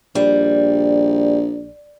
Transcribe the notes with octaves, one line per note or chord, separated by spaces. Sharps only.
A#1 G3